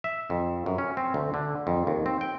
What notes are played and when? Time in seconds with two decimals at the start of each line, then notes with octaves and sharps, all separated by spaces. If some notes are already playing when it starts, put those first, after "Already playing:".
0.04 E5
0.30 F2
0.66 F#2
0.78 C#4
0.97 C4
1.14 D2
1.34 D3
1.67 F2
1.87 D#2
2.06 C4
2.21 G5